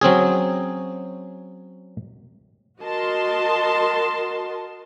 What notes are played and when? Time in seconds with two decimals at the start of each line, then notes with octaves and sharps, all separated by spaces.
0.01 F#3 C4 C#4 G#4
2.80 F#4 A#4 D#5 A5 C6